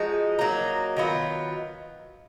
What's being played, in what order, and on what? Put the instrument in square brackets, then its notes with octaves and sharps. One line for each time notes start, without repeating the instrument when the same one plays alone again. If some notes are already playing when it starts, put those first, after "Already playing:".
Already playing: [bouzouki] F3 G#3 D#4 F#4
F#3 A#3 D#4
D#3 F#3 B3 F4